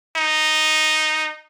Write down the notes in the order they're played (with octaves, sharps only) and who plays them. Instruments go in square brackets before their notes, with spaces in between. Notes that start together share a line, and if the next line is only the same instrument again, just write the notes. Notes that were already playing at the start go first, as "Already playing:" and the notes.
[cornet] D#4